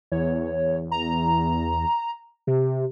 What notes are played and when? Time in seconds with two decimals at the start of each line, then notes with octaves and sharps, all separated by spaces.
0.12 E2 C#5
0.91 A#5
2.47 C3